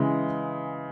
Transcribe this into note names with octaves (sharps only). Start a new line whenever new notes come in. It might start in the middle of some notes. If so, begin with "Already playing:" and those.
Already playing: C#3 E3 G#3